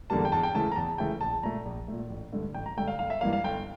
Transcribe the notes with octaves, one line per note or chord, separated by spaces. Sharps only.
E2 D3 G3 A#3 A5
G5
E2 A5
G5
C#3 E3 A3 A5
A#5
E2 A5
C#3 E3 A3 G5
A#1 A5
A#2 A3 A#5
A#1
A#2 A3
A1
G2 D3 A3
A1 G5
A#5
G2 D3 A3 G5
F5
G1 F5
E5
G2 E3 A#3 F5
F5
G1 G5